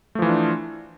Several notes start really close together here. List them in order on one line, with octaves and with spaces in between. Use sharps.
A3 F3 E3 F4 D4